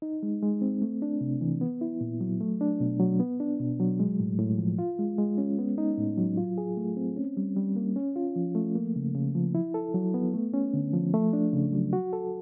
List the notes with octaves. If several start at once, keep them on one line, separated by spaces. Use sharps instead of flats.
D#4
G#3
G#3
C4
A3
D4
C3
E3
B3
E4
A#2
F#3
A3
D4
B2
F#3
B3
D4
B2
F#3
G#3
A2
A2
F3
F4
G#3
G#3
C#4
B3
D#4
A2
F#3
F4
G#4
A3
C4
C#4
G3
G3
A#3
C#4
F4
F3
A3
A#3
C#3
C#3
F3
E4
A4
F#3
B3
A3
C#4
D3
F3
A3
D4
C#3
F#3
F#4
A4